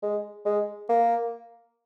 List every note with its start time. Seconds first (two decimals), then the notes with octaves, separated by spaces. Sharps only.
0.03 G#3
0.46 G#3
0.89 A#3